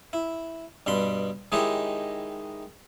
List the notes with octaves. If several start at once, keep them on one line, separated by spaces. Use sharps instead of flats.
E4
G2 B2 B5 C6
D#3 G#3 D#4 E4 G4 C#5